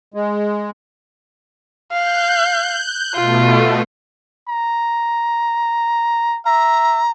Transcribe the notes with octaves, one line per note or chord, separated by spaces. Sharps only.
G#3
F5 F#6 G6
B2 A3 F4
A#5
E5 A#5